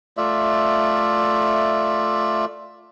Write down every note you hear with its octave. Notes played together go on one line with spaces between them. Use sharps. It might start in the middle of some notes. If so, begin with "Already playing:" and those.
A3 F4 D5 E5